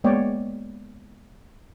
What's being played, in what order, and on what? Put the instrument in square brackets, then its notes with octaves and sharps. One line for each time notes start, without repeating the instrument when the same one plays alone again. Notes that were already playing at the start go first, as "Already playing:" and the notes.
[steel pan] G#3 A#3 B3 C#5 D5 G5